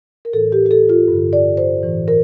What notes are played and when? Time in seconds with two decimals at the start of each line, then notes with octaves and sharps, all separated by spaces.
0.25 A#4
0.33 A2 E3 A4
0.52 G4
0.66 G4
0.71 A4
0.89 F4
1.08 G2 D3
1.33 D5
1.57 C5
1.83 A2 E3
2.08 A#4